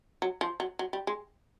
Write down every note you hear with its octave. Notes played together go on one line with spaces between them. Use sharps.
F#3
F3
F#3
F#3
G3
G#3